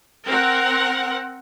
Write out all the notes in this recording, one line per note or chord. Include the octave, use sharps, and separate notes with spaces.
C4 A#4 F#5